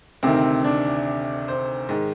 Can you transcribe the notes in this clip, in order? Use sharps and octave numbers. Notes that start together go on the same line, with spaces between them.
D2 C3 D#3 C4
D4
C5
G#2 D#3